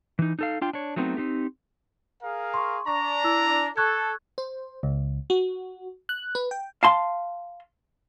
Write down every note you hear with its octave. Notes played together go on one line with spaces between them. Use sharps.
E3 D#4
D#4 A4 F5
D4 F4 G5
D4 C#5
F#3 A3 B3 C4 D#4
C4 D#4 G4
G#4 A#4 F5
C6 C#6
D4 A#5 C#6
E4 E6
A4 C#6 F#6 G#6
C5
C#2
F#4
F#6
B4
G5
F5 A5 C6